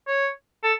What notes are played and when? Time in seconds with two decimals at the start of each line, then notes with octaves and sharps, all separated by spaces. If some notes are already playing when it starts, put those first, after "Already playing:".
0.08 C#5
0.63 A4